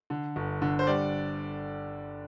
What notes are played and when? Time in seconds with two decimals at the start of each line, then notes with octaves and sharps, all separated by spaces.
0.10 D3
0.36 G1
0.62 D3
0.79 C5
0.87 G3 D5